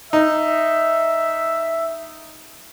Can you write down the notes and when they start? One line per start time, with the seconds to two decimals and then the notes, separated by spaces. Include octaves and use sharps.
0.13 D#4 E5